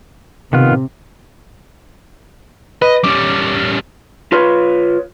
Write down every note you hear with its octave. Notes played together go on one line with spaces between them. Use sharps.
C3 D#3 B3 F4
B4 D#5
G3 C#4 D6
F4 B4 C#5